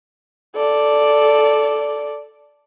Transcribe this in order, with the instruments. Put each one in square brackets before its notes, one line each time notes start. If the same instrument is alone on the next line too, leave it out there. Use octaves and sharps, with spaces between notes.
[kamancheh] A4 D5